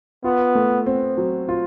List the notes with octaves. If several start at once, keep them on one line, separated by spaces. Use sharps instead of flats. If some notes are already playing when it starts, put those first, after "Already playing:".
B3 F4
A3
C4
F#3
F4